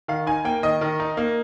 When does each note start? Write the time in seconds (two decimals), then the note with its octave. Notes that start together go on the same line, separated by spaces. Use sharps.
0.08 D#3 F5
0.27 D#4 G#5
0.45 A#3 G5
0.63 D#3 D#5
0.81 D#3
1.00 D#4
1.17 A#3